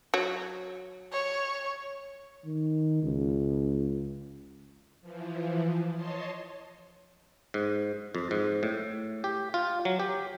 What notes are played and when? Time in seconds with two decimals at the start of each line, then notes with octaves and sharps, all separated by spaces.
0.14 F#3
1.13 C#5
2.45 D#3
3.03 C#2
5.01 E3 F3
5.94 C#5 D#5 A5 C6
7.54 G#2
8.15 F2
8.31 G#2
8.63 A2
9.24 G4
9.54 F4
9.85 F#3
10.00 G4